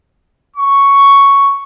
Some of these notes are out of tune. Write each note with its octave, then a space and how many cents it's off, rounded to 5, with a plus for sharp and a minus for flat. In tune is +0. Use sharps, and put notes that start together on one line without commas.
C#6 +5